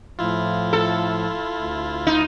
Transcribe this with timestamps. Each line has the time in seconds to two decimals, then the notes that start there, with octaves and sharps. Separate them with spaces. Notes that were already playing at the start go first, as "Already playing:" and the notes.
0.19 A2 F3 E4 F4
0.73 A4
1.56 D2
2.07 D#4